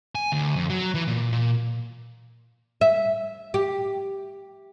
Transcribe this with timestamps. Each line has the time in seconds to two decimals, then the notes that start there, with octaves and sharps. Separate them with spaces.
0.15 G#5
0.32 D2
0.56 F2
0.70 F#3
0.95 E3
1.08 A#2
1.32 A#2
2.81 E5
3.54 G4